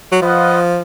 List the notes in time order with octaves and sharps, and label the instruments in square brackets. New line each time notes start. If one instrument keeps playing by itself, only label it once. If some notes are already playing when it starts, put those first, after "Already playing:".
[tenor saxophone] F#3
[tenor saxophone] F3 [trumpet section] F4 B4 D#5 F#5